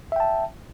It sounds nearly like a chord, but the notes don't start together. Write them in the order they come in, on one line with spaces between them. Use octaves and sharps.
E5 G5 A5